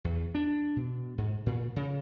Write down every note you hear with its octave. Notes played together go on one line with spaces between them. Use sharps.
E2
D4
B2
G#2
A#2
C#3